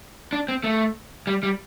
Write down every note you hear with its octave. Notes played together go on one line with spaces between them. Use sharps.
D4
C4
A3
G3
G3